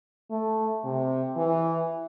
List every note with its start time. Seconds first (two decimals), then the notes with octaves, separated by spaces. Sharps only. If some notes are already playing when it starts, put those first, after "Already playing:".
0.31 A3
0.84 C3
1.37 E3